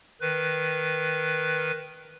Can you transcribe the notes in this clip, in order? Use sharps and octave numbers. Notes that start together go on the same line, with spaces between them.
D#3 B4